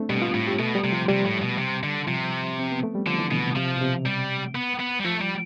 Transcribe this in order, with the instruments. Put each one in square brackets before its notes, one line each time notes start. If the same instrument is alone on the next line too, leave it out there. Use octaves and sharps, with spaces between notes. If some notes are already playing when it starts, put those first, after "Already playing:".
Already playing: [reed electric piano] A3 C4 D4
[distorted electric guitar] B2 [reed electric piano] G3
[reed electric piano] F4
[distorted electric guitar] A2
[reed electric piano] G4
[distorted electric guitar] B2 [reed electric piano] A3
[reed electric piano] G3
[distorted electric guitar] C3
[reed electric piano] F3
[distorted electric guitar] C3 [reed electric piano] G3
[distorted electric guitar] A2
B2
C3
D3
[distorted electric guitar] C3 [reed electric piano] F3
[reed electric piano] C4
B3
A3
G3
[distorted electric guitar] D3 [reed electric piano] F3
[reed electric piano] E3
[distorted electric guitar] B2 [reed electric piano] D3
[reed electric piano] C3
[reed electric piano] C3 [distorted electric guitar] F3
[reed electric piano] B2
C3
[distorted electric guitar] G3
B3
B3
G3
[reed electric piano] F3 [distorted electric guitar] A3
[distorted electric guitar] G3